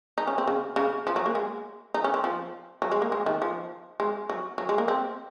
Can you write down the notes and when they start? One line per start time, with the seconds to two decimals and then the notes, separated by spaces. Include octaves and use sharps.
0.18 D#4
0.27 C#4
0.38 C4
0.48 C#3
0.76 C#3
1.07 F3
1.16 F#3
1.26 A#3
1.35 G#3
1.94 D#4
2.04 C#4
2.14 C4
2.24 F3
2.82 F#3
2.92 G#3
3.02 A#3
3.12 G#3
3.26 D#3
3.42 F3
4.00 G#3
4.30 F#3
4.58 F#3
4.69 G#3
4.78 A#3
4.88 C4